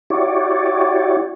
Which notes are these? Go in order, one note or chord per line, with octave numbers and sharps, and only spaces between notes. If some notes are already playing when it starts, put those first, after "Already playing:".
E4 F#4 G4 C#5 D5